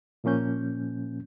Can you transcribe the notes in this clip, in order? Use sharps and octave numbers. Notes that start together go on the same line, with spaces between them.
A#2 F3 A#3 C#4 G6